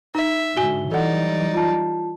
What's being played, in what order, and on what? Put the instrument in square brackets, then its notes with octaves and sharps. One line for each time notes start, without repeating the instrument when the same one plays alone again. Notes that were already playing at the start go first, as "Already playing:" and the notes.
[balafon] D#4 [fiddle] E5
[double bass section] G#2 D3 [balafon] F#4 G#5 [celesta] G7
[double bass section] E3 F#3 G3 [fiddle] D#4 D5 [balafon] A4 F#5
[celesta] F4 A5